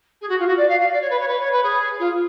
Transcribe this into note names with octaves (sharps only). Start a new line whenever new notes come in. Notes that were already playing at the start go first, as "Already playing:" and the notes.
G#4
F#4
F4
F#4
D5
F5
F5
D5
C#5
B4
C#5
B4
C#5
B4
G#4
F4